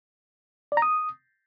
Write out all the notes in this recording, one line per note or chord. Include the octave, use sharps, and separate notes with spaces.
D5
A#5
D#6